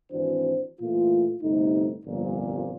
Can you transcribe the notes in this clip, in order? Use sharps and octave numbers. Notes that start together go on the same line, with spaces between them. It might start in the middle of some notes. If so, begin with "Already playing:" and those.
G#1 E3 C4 D4 F#4 C5
A#2 E3 A3 F4
G1 C3 A3 D#4
G1 C2 F2 A#2